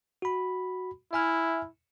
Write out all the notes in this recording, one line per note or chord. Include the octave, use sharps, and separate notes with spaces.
F#4 B5
E4 E5 G#5 F6